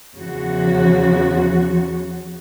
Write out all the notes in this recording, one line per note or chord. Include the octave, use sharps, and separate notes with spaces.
E2 C#3 F3 F#4